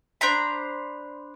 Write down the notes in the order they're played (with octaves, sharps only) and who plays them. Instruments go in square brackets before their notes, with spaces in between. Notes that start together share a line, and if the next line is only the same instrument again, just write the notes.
[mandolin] D4 C5 A#5 B5